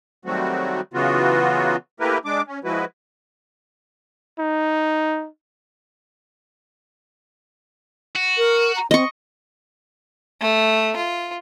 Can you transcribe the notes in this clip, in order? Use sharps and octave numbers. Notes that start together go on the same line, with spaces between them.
D#3 F#3 G3 A3 C4 F#4
C#3 E3 F#3 B3 F4 F#4
A3 A#3 E4 G4 A#4 B4
G#3 D4 D6
C#4
F3 G#3 E4 F#4 B4
D#4
F#4
A#4
A#5
C4 D#5 C#6
A3
F4